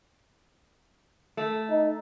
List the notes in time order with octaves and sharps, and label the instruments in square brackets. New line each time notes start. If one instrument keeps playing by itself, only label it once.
[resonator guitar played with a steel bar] A3
[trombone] D#4